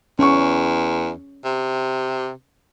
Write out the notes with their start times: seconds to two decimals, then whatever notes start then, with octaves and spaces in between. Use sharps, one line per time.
0.19 E2 C#4 C#6
1.45 C3